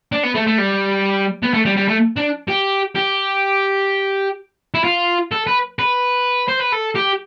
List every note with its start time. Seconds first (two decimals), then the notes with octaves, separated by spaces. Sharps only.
0.12 D4
0.24 B3
0.35 A3
0.47 A3
0.58 G3
1.43 B3
1.54 A3
1.65 G3
1.77 G3
1.88 A3
2.16 D4
2.48 G4
2.95 G4
4.74 E4
4.84 F4
5.32 A4
5.47 B4
5.79 B4
6.48 C5
6.60 B4
6.73 A4
6.96 G4